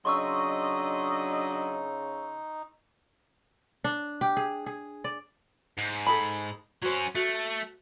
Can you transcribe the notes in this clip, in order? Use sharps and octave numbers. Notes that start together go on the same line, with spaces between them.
C#3 F#3 D4 D#4 D#5 C6 C#6 E6
D4
G4
G#4
G#4
D5
G#2
G#4 A4 B5
F#3 C#4 F#4 C5
A3 F#4